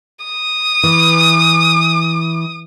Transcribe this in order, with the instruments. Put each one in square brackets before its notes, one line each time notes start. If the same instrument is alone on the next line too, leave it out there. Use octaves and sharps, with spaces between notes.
[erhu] D#6
[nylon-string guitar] E3